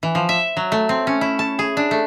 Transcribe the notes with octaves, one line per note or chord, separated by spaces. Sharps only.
E3
F3
E5
F#3
A3
C4
C#4
E4
A5
G#4
D4
A3